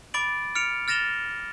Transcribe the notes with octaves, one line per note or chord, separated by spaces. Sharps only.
B5 D6 A6 D7 F#7
F6 C#7 D7 F7
F6 A6 A#6 E7 F7 G7